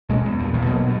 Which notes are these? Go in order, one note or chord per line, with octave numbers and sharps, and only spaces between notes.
B2 G#3 A#3 C#4
E2
G2 A#2
A#1 E2 G2 A#2
B2 F#3 A#3
G2 B2